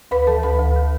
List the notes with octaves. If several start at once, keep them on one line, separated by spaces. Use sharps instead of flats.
D2 B4 B5
E3 A4 A5
D2 B4 B5
D2
E3